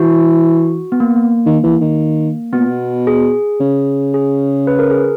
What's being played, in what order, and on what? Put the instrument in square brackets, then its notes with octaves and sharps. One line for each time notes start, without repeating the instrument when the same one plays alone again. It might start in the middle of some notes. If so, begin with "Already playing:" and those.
Already playing: [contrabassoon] E3 [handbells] F#4
[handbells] B3
A#3
A#3
[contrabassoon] D#3
E3
D#3
[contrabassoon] B2 [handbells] B3
[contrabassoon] A#2
B2
[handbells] G#4
[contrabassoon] C#3
[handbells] G#4
B4
A#4
G#4